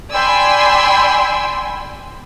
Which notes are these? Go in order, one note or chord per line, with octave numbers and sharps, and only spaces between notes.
D5 G5 G#5 B5 C6 E6